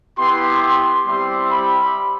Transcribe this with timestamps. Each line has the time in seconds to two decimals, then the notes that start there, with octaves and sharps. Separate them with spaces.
0.18 B3 E4 G4 C6
0.63 C6
1.06 G3 C4 E4 G4 C6
1.50 B5